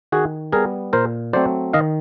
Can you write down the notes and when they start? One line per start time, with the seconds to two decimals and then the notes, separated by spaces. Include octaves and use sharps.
0.12 D#3 F#4 G#4
0.52 G3 B3 G#4 A#4
0.93 A#2 A#4 C5
1.33 F#3 A3 C4 C5 D5
1.73 D#3 D#5 F5